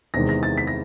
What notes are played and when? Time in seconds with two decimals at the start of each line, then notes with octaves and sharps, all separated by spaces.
0.14 E2 C3 D#3 G#3 A#6
0.29 A#6
0.43 A6
0.58 B6
0.67 A#6